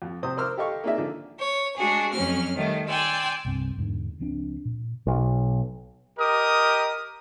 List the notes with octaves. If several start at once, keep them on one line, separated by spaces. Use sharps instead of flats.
F2
C3 C5 D#6
A#4 C5 C6 D6 E6 F6
G4 A4 D#5 F5 C#6
A#3 D#4 F4 G#4 D5 E5
D3 F3
C#5
G#3 D4 F#4 G#4
F2 F#3 C#4 F6
D#3 G3 A3
D5 G5 G#5 C6 E6
C2 G2 C4
E2 G#2 D3
C#2 F3 C4 D4
A#2
B1
G4 A#4 D#5 D#6